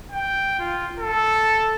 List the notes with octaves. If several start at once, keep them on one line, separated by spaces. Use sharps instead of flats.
G5
F4
A4